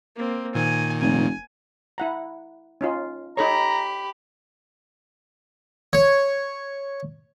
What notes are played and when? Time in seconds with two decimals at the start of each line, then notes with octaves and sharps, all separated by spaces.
0.16 A#3 C4
0.55 A#2 D#3 G#5
1.02 F1 G#5
1.98 E4 F#5 A#5
2.81 C#4 D#4 F4
3.37 D#4 G4 A4 C#5 A#5 B5
5.93 C#5